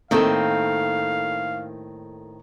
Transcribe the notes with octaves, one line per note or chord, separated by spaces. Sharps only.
A2 D#3 A#3 C4 A4 F5